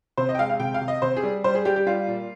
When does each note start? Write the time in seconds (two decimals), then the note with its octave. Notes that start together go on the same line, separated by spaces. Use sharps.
0.17 C3 C5
0.29 D#5
0.35 G5
0.39 G#3 F5
0.50 F5
0.60 C3 G5
0.74 F5
0.81 C3
0.88 D#5
1.02 C3 C5
1.17 G#4
1.23 G3
1.44 G3 C5
1.55 G#4
1.65 G3 G4
1.76 G4
1.87 G3 F4
2.07 A#2